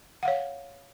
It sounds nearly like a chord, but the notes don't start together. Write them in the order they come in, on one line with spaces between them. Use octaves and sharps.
F#5 F5 C#5